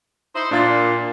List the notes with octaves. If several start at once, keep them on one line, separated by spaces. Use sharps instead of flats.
D#4 E4 C5
A#2 D4 F4 A6